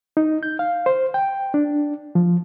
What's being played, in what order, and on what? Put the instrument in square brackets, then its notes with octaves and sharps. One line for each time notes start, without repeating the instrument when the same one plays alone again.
[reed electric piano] D#4
G6
F5
C5
G5
D4
F3